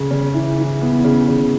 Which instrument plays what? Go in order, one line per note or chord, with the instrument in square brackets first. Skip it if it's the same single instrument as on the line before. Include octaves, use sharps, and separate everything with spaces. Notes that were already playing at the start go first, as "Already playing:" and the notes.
Already playing: [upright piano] C#3
C#3
E3
E3
B3
C#3
C#3